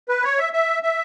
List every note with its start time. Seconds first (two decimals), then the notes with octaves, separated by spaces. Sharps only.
0.09 B4
0.24 C#5
0.39 E5
0.53 E5
0.83 E5